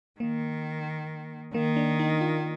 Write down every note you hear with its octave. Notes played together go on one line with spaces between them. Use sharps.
D#3 A#3
D#3 A#3
D4
D#4
F4